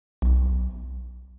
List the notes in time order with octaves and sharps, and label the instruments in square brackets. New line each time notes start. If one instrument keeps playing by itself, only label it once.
[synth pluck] B1